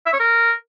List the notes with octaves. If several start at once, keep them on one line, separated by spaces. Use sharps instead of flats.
E5
C#5
A#4